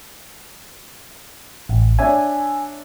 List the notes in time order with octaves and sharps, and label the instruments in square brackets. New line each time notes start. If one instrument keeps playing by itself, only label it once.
[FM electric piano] A1
[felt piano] D4 C#5 E5 [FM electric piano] G#5